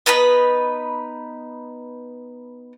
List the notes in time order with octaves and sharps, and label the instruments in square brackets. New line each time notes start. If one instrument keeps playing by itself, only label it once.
[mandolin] B3 D#4 B4 B5